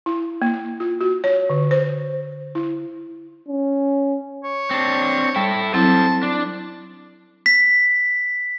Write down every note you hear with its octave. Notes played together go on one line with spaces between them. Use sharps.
E4
A#3
F4
F#4
C#5
D3
C5
E4
C#4
C#5
C4 D4
G3 E4 A4
F#3 C4 E4 A4 C5 A5
D4
B6